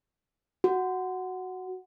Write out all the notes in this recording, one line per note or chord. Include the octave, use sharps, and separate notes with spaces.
F#4